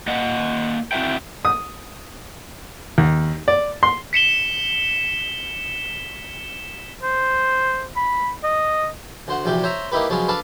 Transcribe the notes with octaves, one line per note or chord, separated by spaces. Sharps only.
A#3 D#5 F#5
C4 E4 F#4 E5 G5
D#6
D#2
D5
C6
B6 C#7 E7 G7
C5
B5
D#5
D2 C5 F#5
A#1 E2 C3 F#4 G4
C5 C#5 E5 A#5
A#3 D#4 E4 G4 B4
F3 F#3 G#3 B3 C#4
D4 A4 B4 F5 A5